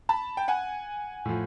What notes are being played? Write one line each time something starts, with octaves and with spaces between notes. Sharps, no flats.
A5 B5
G5
F#5 G#5
A2 F3